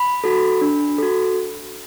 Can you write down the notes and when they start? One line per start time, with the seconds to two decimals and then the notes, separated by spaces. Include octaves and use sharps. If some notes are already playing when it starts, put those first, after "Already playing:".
Already playing: B5
0.24 F#4 A4
0.61 D4
0.98 F#4 A4